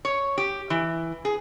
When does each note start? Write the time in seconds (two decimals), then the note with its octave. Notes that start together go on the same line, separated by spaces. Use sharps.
0.05 C#5
0.38 G4
0.70 E3
1.25 G#4